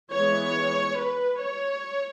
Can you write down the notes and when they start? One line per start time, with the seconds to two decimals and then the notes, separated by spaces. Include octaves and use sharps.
0.13 E3 G#3 B3 C#5
0.99 B4
1.41 C#5